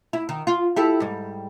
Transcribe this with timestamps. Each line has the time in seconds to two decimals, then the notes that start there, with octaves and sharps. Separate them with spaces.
0.13 E4
0.29 D#3
0.47 F4
0.76 E4 G4 A4
1.00 G#2 G3